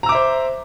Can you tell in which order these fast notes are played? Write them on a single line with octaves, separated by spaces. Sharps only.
A#5 E6 D6 E5 C5